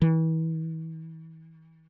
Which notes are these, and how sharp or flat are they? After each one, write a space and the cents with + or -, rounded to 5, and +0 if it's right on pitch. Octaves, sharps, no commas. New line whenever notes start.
E3 -35